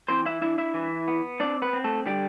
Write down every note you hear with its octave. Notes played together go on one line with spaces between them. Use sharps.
E3 C4 C5
E4 E5
D4 E4 E5
E4 E5
E3
B3
C4 D4 D5
B3 B4
C4
A3 A4
D3 G3 G4